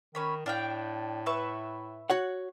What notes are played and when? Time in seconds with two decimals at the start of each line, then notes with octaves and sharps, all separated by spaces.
0.15 D#3 C#4 C#5 B5
0.46 A2 D4 F5 G5
1.26 B4 E5 C#6
2.10 F#4 C#5 F#5